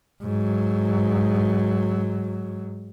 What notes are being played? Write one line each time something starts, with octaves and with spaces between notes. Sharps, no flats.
G#2 F#3